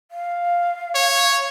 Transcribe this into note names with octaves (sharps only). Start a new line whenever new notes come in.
F5
C#5